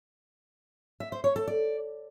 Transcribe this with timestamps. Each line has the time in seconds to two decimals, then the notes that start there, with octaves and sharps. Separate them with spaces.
1.00 E5
1.12 C5
1.24 C#5
1.36 A4
1.47 D5